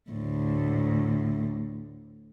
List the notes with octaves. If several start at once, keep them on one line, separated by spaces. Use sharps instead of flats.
D2 A2